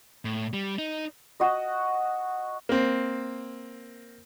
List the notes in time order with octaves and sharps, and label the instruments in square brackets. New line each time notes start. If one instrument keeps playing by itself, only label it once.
[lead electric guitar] A2
G3
D#4
[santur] F#4 D#5
[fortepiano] A#3 C4